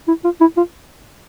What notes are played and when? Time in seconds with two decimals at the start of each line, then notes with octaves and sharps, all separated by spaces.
0.08 E4
0.24 F4
0.41 E4
0.57 F4